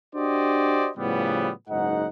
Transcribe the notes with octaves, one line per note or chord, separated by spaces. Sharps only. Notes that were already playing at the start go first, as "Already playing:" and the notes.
D4 F#4 G4 C5 D5 D#5
A2 C#3 F3 G3 B3
F#1 G#2 D#4 F#5